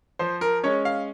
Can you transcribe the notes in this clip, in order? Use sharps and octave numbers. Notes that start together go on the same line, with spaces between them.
F3 C5
A#4
G#3 C#4 C#5
F5